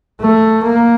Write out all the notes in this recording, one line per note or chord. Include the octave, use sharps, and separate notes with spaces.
A3
A#3